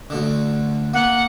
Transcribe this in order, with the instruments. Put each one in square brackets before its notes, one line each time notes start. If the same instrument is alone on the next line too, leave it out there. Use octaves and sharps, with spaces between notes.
[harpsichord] D2 D3
[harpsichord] A#3 [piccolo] F#5